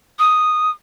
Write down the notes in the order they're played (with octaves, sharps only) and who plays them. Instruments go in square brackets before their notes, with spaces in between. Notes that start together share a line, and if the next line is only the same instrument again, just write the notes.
[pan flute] D#6